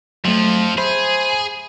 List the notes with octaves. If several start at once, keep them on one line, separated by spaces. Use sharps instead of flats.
F2 F3 F#3 A3
G#4 C5 E5 B5